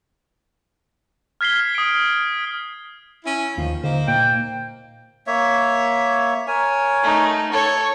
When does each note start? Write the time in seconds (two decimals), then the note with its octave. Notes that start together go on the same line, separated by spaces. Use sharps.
1.41 F6 G#6 B6 C7 G7
1.75 D#6 D7
3.25 C#4 E4
3.58 D#2 D#3 F3
3.84 D3 A#3 D#4 C5
4.08 A#2 G5
5.27 A#3 C#5 E5
6.47 A#4 C#5 G#5
7.03 A3 D#4
7.52 A4 C#5 C#6